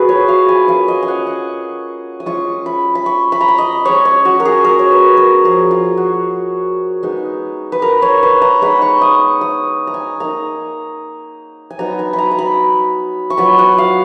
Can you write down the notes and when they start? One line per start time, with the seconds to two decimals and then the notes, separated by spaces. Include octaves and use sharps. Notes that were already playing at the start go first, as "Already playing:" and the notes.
Already playing: A#3 F4 F#4 G#4 B4
0.09 C#5
0.28 F5
0.48 G#5
0.68 A#3 C#4 F4 F5
0.88 D#5
1.02 G#5
1.08 F#5
1.27 C#6
2.20 D#6
2.26 G#3 C#4 F4 C#6
2.66 B5
2.95 B5
3.06 C#6
3.32 B5
3.41 A#5
3.48 B5
3.58 D#5
3.85 G#3 C#4 F4 C#5
4.05 C#5
4.25 F#4
4.40 A#4
4.45 G#4
4.64 A#4
4.79 C#5
4.92 B4
5.17 A#4
5.44 F3 A#3 F4 G#4
5.71 F4
5.97 F#4
7.03 G#3 B3 D#4
7.72 B4
7.82 A#4
8.02 C#5
8.23 B4
8.42 A#5
8.62 G#3 B3 D#4 B5
8.82 C#6
9.01 D#6
9.41 D#6
9.87 A#5
9.94 G#5
10.20 A#3 D#4 A#5
11.70 G#5
11.79 F#3 B3 D#4 A#5
11.99 G#5
12.13 B5
12.18 A#5
12.31 A#5
12.39 B5
13.30 C#6
13.38 F#3 B3 F4 B5
13.58 F#5
13.78 F5